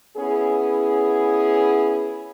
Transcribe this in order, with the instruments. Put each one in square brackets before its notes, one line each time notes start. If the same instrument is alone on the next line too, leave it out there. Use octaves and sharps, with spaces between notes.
[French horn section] B3 C#4 E4 G#4